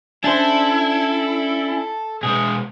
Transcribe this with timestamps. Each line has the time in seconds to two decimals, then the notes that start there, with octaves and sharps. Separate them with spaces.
0.24 C#4 D4 E4 A4 C5
2.23 B2 G#3 G#4